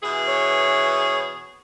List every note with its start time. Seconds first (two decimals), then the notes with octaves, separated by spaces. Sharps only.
0.03 B2 E3 G#4
0.28 C#5